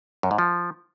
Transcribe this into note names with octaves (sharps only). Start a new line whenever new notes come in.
F#2
G#2
F3